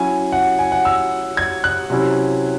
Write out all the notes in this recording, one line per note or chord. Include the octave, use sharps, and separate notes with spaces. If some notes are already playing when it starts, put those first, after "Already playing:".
Already playing: F#3 C#4 E4 G#5
F#5
G#5
F#5
E6
G#6
F#6
C3 F#3 C#4 E4